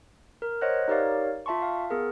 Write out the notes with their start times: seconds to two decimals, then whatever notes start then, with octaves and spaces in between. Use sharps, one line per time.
0.42 A#4
0.61 C5 C#5 D#5 F#5 F#6
0.88 D#4 G4 A#4 C#5 D5 F5
1.46 F4 E5 A5 C6 C#6
1.62 F5
1.90 B3 G#4 A#4